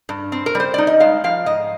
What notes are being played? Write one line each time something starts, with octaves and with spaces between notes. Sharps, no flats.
G2
C4
A#4
G3
C5
D#4 D5
D#5
G#3 F5
F3 F5
G#2 D#5